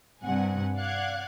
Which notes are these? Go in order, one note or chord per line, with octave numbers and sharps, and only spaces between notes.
G2 C3 F#5 G#5
D5 F5 F#5 F#6 G#6